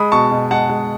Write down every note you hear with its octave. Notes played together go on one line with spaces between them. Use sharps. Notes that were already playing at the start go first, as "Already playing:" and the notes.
Already playing: G#3 B5 D#6
B2 A5 C#6
B2
G#3 F#5 A5
G#3